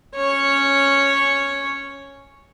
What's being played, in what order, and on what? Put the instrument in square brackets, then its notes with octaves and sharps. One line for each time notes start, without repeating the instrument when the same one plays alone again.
[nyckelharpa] C#4 C#5